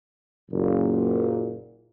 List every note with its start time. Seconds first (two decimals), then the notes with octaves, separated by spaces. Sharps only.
0.51 F#1 A#2